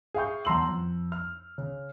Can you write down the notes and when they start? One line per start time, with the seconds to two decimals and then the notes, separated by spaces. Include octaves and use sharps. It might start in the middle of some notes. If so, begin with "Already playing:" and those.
0.14 G#4 E5 F5 G5 C#6 G6
0.45 E2 A5 A#5 C6 E6 F#7
0.68 F2
1.12 F6
1.58 C#3